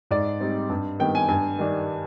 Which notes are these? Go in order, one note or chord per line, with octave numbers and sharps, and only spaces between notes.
G#2 D5
G3 C4 D#4
G2
D#3 G3 B3 G5
G#5
G2 G#5
D#3 G3 D4